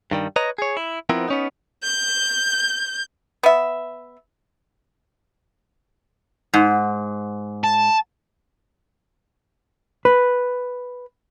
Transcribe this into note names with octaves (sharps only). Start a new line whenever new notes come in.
G2 D#3 G3
B4 C#5 D#5 A#5
G#4 C#5
E4
F3 B3 C4 E4 A#4
B3 C#4 D#4
G6
B3 E5
G#2
A5
B4